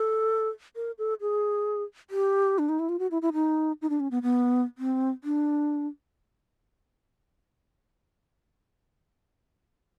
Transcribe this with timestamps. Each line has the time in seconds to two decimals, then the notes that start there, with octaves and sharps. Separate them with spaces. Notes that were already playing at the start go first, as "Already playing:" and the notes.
Already playing: A4
0.76 A#4
0.98 A4
1.21 G#4
2.10 G4
2.59 D4
2.69 D#4
2.79 E4
2.89 F4
2.99 F#4
3.11 E4
3.22 E4
3.33 D#4
3.82 D#4
3.90 D4
4.00 C#4
4.11 B3
4.23 B3
4.78 C4
5.24 D4